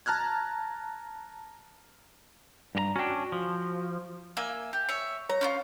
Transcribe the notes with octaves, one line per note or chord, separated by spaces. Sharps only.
A5 A#5 F6 F#6 G#6
G2 G4 A#5
C#4 D4 F#4 G5
F3
A#3 E5 G#5
G4
C#5 E5
C#5 A#5
C#4 E4 F4